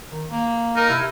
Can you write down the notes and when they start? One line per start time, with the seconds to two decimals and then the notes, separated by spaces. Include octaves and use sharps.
0.11 D#3
0.31 A#3
0.76 D#4 A#4
0.89 C3 E4